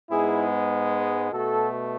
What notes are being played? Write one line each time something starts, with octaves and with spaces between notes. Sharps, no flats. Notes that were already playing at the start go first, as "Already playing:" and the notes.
G#2 G#3 B3 E4 G#4
B2 A3 F#4 A4